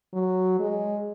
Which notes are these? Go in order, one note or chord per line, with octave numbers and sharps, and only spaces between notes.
F#3
G#3